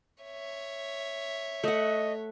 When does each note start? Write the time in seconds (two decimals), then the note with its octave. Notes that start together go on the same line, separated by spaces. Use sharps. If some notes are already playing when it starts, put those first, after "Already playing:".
0.23 C#5 E5
1.64 A3 D#5 F#5